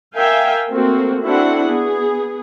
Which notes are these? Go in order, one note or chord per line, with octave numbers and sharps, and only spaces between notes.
A#4 E5 F5 G5 G#5
A3 A#3 C4 F#4
C4 D4 E4 F#4 A4 F#5
B3 G#4